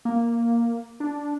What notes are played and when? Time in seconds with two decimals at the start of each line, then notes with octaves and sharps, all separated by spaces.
0.05 A#3
1.00 D4